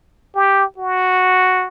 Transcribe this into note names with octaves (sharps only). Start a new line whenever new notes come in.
G4
F#4